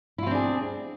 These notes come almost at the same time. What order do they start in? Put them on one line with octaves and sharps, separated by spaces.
E4 F4 C4 D4 G#4